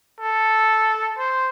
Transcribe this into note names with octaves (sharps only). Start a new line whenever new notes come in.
A4
C5